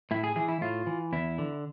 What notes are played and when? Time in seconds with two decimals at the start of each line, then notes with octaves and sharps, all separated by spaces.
0.11 A2 E4
0.24 G#4
0.36 E3 G#4
0.48 E4
0.61 A2 F4
0.87 E3
1.13 E2 E4
1.38 D3